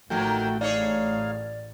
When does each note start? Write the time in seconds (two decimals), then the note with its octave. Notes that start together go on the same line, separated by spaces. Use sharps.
0.10 A1 A2 D#3 F3 A3 A#3 F#4 G5
0.61 D#4 G#4 C#5 D5 F5